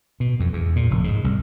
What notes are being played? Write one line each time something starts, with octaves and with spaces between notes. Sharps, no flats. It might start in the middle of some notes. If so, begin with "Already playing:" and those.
B2
F2
E2
A#2
F1
G#2
C2